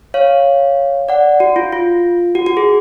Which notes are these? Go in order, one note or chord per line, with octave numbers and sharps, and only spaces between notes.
C#5 F5
D5 F#5
F#4
F4
F4
F#4
F#4
G#4